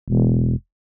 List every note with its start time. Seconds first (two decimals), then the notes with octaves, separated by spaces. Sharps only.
0.08 E1